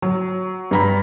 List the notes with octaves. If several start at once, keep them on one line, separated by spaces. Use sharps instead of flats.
F#3
G2 A#5 B5